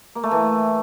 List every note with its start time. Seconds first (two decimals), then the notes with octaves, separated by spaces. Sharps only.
0.15 A#3
0.23 A3
0.31 E3